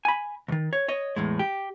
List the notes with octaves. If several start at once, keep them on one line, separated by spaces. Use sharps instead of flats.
G#5 B5
D2 D#3
C#5
C#5 D#5
E2 A2 G#3
G4